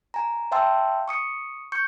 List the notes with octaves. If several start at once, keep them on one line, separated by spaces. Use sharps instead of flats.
G#5 A#5
E5 F5 G5 A5 C6 E6
C#6 D#6 C#7
C#6 G6 C#7